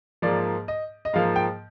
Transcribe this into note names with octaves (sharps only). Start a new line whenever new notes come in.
G#2 F3 A#3 D5
D#5
D#5
G#2 F3 A#3 F5
G5